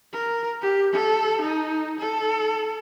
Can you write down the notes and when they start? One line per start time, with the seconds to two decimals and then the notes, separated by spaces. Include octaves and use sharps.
0.13 A#4
0.61 G4
0.93 A4
1.41 D#4
1.99 A4